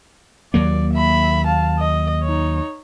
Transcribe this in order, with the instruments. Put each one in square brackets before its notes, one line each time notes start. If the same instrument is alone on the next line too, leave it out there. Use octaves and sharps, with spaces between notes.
[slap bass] D#2 F#3 A#3 [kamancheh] D5
[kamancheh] E5 B5
F5 A5
D#5
D#4 C#5